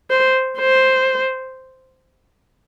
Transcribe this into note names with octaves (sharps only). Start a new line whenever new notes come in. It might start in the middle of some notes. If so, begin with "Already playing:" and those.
C5
C5